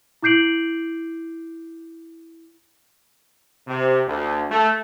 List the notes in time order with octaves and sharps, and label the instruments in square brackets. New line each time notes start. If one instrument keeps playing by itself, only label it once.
[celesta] E4 D6 G6 C7 D7 F#7
[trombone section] C3
D2
A3